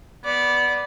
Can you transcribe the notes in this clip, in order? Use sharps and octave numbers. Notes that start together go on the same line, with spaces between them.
B3 D5